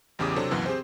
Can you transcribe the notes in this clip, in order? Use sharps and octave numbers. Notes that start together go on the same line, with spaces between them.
A1 E2 C#3 G4 D6 D#6
C3 F#3 C4 D4 A4
C#2 F#2 B2 E3 F#3
C4 G4 G#4 C5